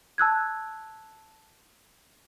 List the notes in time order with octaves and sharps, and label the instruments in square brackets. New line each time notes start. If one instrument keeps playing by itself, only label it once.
[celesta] A5 E6 F#6 G#6